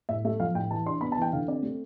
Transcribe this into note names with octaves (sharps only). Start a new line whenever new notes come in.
A2 E5
A3 E5
F3 F5
A2 G5
E3 A5
D4 C6
B3 B5
A5
E3 G5
D3 F5
C4 D5
A3